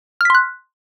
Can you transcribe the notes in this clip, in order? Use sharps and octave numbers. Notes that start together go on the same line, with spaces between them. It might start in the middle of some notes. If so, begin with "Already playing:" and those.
C6 F6 F#6 B6